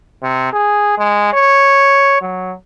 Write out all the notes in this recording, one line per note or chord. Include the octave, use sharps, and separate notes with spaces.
C3
G#4
G#3
C#5
F#3